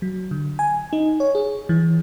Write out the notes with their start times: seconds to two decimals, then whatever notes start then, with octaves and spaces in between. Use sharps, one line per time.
0.02 F#3
0.31 D3
0.59 G#5
0.93 D#4
1.20 C#5
1.35 G#4
1.69 E3